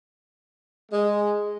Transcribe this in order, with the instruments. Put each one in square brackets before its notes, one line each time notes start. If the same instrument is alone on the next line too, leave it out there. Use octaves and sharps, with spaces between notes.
[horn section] G#3